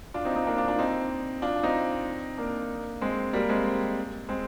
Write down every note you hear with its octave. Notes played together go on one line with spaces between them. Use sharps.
D4 F4
C4 D#4
C4 D#4
A#3 D4
D4 F4
D4 F4
C4 D#4
D4 F4
C4 D#4
A#3 D4
G#3 C4
G3 A#3
G#3 C4
G#3 C4